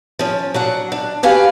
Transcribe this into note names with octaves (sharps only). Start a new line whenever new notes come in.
F3 C#4
F#3 D4 F#5
D4
F#4 G4 B4 F5 G#5